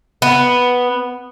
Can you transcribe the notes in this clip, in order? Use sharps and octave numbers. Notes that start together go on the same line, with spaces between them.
B3